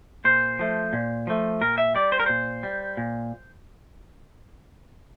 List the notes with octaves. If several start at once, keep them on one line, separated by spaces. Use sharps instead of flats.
A#2 C5
F3 A3
A#2
F3 A3
A#2 A#4
E5
G3 D5
C5
A#4
A#2 C5
G3
A#2